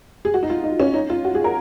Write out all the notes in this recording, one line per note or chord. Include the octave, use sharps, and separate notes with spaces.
G#4
F#4
D#4
F4
D#4
C#4
D#4
F4
F#4
G#4
A#4